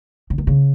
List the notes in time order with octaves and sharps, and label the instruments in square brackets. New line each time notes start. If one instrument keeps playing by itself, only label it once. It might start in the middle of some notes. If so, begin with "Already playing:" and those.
[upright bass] C#3
D#3
C#3